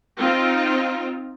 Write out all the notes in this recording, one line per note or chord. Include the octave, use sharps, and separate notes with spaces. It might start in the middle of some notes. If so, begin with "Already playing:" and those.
C4 D#4 F4